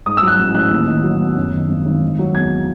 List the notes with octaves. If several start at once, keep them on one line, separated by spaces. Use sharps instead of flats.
G#2 D#6
E6
F#3
F#6
A1
A1 F#6
D#2
D#3
F#3
E1
F#2
D#3
G#1
G#1
D#3
F#3
E2 G#6